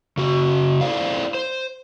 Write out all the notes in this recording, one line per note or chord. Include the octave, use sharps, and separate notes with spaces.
C#3 F#4
E4 A4 C5 D5 F5
C5